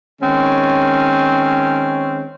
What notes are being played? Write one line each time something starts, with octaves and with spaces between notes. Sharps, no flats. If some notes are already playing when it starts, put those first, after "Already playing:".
D#3 G#3 C4 C#4